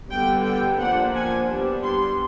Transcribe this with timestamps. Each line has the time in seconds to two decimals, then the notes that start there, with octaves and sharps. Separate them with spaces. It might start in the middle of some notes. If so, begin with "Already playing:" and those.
0.11 D3 G3 B3 G5
0.45 G5
0.80 F3 A#3 D4 F#5
1.15 G#5
1.49 G3 B3 D4
1.83 C6